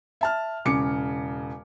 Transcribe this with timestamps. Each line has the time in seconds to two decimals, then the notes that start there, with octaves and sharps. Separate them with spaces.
0.21 E5 A5 F6
0.65 E1 C#3 D6 C#7